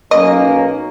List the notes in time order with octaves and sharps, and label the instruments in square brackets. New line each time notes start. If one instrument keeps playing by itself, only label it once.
[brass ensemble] B1 A#3 C#4 [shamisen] D#5